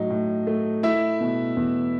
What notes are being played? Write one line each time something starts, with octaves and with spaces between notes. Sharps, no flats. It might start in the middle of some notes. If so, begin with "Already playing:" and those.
Already playing: A2 F#3 D#4
A2
A3
A3 E4 E5
B2
E2